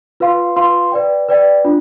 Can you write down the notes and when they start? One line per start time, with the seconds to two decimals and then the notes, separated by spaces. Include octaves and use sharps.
0.20 F4 B4 F5 C6
0.56 F4 B4 F5 C6
0.92 B4 D5 G5
1.29 B4 D5 G5
1.65 D4 F4